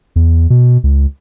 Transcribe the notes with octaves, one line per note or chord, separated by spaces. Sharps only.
E2
B2
C#2